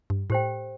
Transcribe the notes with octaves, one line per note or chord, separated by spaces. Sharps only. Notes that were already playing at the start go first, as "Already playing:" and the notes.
G2
A2 G4 C5 G5